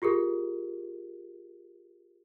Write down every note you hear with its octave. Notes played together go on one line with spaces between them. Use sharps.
F4 G4 G#4 A#4